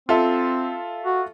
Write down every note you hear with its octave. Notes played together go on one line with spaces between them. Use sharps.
C4 F4 A4 E5
F#4